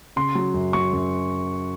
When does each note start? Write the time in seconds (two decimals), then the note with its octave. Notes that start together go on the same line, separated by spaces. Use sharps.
0.16 C#3 C6
0.35 F#3
0.54 F#2
0.73 F#3 C#6
0.93 F#2